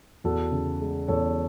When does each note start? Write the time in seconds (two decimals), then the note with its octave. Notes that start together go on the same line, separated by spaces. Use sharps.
0.24 E2 F#4 A4
0.52 C#3
0.81 G#3
1.08 E2 A4 C#5